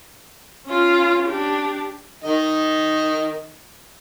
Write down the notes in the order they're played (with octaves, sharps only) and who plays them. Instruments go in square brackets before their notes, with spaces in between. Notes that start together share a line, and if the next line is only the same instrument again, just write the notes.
[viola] C#4 F4
D4 G4
[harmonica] D#3 D#5